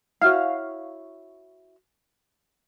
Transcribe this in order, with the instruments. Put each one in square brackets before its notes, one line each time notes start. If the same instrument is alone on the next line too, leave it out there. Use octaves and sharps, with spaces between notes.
[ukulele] E4 F#4 C#5 [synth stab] F5